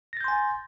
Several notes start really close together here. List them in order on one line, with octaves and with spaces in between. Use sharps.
A#6 A6 G6 C6 G#5